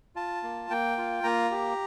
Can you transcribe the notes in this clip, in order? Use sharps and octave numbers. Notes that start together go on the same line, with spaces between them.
F4 A5
A#3
A#3 G5
F4
A#3 A#5
G4